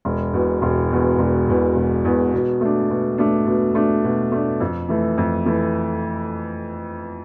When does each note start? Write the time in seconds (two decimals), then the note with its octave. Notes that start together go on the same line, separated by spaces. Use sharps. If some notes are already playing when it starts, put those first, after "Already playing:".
0.05 E1
0.33 E2 B2
0.62 E1
0.91 E2 B2
1.19 E1
1.48 E2 B2
1.75 E1
2.05 E2 B2
2.33 B2
2.61 A3 D4
2.90 B2
3.18 A3 D4
3.47 B2
3.75 A3 D4
4.04 B2
4.32 A3 D4
4.61 F2
4.89 E3 A3
5.18 F2
5.46 E3 A3